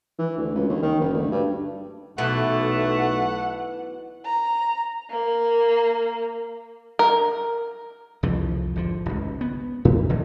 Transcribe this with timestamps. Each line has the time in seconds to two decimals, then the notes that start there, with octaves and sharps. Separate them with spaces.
0.19 E3
0.37 D2
0.54 C#2
0.69 D#2
0.82 D#3
1.00 F#1
1.13 D2
1.31 G2
2.18 B1 B2 E3 A3 F#5
4.25 A#5
5.11 A#3
6.99 A#4
8.23 C2 F2 E3 F3
8.76 G#1 D3 F3
9.06 G#1 C#2
9.41 B3
9.85 G#2
10.09 D1 D3 F#3 G3